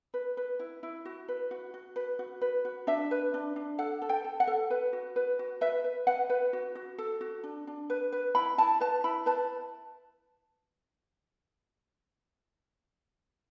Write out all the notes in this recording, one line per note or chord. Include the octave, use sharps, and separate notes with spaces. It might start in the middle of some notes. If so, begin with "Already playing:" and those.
B4
B4
E4
E4
F#4
B4
F#4
F#4
B4
F#4
B4
F#4
D4 E5
B4
D4
D4
A4 F#5
A4
G5
A4
F#5
A4
B4
F#4
B4
F#4
B4 E5
B4
B4 F#5
B4
F#4
F#4
A4
F#4
D4
D4
B4
B4
E4 B5
E4 A5
B4 A5
E4 B5
B4 A5